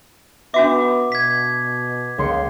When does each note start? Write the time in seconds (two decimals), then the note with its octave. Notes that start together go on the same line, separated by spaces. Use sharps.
0.54 B3 D4 F#4 E5 D6
1.12 B2 G#6 B6
2.18 C#2 A#3 C6 C#7